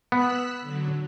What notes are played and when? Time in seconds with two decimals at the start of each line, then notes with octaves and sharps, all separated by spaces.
0.12 B3 E6 F#6 B6
0.62 D3 F#3